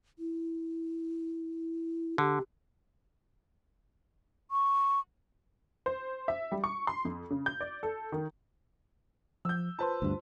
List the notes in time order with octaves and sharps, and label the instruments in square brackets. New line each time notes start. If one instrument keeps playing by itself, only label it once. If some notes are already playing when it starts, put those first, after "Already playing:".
[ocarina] E4
[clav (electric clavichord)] D3 [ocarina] G4
[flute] C#6
[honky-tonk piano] C5
E5
G3
C#6
C6
F2
C#3
G6
D5
A4
D#3
[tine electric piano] F3 [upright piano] E6 G6
[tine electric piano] F4 C5 C6 [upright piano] B4 A5
[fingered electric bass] D2 G2